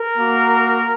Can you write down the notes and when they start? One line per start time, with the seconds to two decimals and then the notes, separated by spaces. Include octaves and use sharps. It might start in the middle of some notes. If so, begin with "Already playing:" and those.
Already playing: A#4
0.18 A#3 F#4